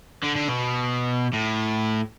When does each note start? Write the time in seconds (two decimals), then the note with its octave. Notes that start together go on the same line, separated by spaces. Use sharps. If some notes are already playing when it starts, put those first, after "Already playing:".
0.23 D3
0.35 D3
0.48 B2
1.33 A2